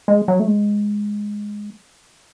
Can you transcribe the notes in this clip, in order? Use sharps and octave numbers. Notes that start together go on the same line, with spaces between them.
G#3
F#3
A3
G#3